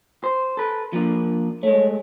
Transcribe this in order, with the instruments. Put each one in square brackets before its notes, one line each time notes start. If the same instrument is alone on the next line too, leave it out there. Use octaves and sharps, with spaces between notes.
[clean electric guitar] C5
A4 B4
F3 A#3 D4
[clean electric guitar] G#3 A3 [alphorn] C#5